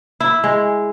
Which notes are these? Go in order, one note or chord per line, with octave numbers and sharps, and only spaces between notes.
E4
G#3